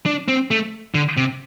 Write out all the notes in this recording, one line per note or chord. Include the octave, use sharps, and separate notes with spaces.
D4
C4
A3
D3
C3